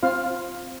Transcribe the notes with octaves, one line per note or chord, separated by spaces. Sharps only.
C4 F4 F5